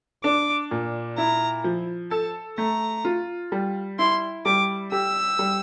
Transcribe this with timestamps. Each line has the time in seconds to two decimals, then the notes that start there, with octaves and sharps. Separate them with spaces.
0.24 D4 D6
0.71 A#2
1.18 E4 A#5
1.64 F3
2.11 A4 A5
2.58 A3 A#5
3.05 F4
3.52 G3
3.99 E4 C6
4.45 G3 D6
4.92 G4 E6
5.39 G3